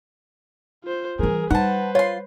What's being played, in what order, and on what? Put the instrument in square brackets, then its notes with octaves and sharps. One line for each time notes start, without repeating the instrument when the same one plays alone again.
[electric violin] F4 C5
[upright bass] E3 G3 [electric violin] G#4 A#4
[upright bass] G3 [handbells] D#4 [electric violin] B4 C5 [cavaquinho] F#5 A5
[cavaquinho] F4 C6 [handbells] C#5